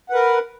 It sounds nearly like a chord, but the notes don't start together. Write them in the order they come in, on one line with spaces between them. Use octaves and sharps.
F#5 B4 A#4